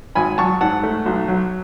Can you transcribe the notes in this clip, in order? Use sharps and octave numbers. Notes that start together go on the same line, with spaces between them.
G#1 G#5 B5
F#3 A5 C#6
G#2 F#5 A5
A3
B1
F#3